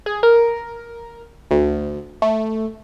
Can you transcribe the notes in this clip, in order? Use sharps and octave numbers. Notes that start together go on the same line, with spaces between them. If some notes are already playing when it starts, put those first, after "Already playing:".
G#4
A#4
D2
A3